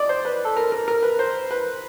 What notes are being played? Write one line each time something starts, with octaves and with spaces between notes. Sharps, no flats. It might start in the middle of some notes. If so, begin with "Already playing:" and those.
Already playing: D5 D#5
C5
B4
A4
A#4
A#4
A#4
B4
C5
B4